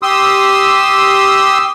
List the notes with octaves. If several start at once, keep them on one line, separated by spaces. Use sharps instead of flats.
G4 C6 D#6 E6